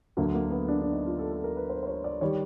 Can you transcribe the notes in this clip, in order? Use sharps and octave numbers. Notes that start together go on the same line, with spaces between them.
D2 D3 F#3 A#3
A#3
B3
D4
D4
D#4
F4
A4
A4
A#4
B4
C5
C5
C#5
D5
D#3 G3 C#5